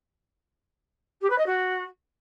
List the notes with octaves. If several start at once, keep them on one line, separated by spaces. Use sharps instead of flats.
G4
B4
D#5
F#4